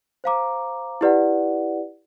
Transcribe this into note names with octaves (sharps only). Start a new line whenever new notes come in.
C5 F5 A#5 D6
E4 G4 B4 D5 F#5